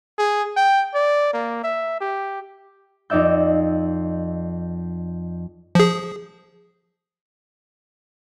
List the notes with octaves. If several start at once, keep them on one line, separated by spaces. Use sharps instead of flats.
G#4
G5
D5
A#3
E5
G4
F2 D#4 D5 E5 G6
F3 G#4